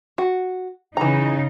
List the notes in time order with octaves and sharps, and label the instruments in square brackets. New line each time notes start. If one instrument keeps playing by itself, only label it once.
[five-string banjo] F#4
[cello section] C#3 D#4 [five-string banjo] E3 A#5